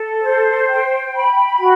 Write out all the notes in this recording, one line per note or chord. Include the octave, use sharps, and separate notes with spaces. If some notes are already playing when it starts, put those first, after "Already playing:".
Already playing: A4
C5
G5
B5
F#4